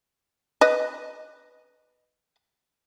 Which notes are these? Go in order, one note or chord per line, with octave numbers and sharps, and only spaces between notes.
B4 D#5